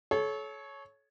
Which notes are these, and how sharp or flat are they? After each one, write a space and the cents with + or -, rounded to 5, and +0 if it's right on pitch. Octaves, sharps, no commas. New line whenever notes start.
A4 -35 C#5 +0